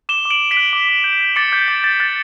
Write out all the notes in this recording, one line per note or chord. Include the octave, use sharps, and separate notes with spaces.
D6 E7 G7
D6
D7 F#7
D6
B6 D7
F#6
D6
D6
G6
G6
D6 A6 C#7
D6 G6
D6 A6
D6 A6
F#6 A6